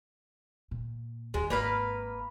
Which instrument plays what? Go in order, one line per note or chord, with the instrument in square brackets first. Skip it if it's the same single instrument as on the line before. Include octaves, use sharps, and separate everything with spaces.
[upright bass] A#2
[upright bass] D#2 [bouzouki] G#3
[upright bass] G#1 [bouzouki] A#3 B4 F5